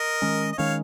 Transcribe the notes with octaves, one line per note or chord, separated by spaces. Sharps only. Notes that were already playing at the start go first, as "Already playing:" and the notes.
Already playing: A#4 D#5
D#3 G#3 C#4
D#5
D#3 G#3 C#4 C#5 F5